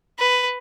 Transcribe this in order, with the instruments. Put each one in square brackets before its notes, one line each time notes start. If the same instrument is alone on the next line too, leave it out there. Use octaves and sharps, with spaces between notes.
[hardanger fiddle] B4